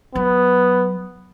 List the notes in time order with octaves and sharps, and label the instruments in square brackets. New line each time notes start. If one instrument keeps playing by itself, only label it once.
[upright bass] F#3 [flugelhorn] B3